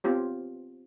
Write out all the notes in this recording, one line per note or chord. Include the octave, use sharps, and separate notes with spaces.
B3 C4 F4 G4 C#5